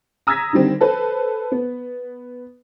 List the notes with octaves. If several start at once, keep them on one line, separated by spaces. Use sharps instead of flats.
A#5 D#6 E6 G#6 A#6 B6
D3 D#3 G3 C4
A4 B4 C5
B3